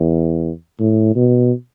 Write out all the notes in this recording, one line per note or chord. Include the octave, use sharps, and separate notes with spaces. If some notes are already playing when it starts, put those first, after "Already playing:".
Already playing: E2
A2
B2